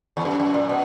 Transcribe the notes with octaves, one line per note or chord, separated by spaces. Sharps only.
E2
F#2
F#2
A#2
B2